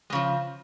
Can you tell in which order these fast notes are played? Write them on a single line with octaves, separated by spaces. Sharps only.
G#3 C#3 F3